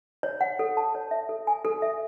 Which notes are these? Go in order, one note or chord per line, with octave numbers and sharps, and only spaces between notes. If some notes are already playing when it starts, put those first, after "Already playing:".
C#5
F#5
A4
A5
C#5
E5
A4
G#5
A4
E5